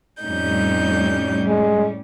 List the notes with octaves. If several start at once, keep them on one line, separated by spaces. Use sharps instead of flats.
F2 A2 G3 C#4 D#4 G6
G#3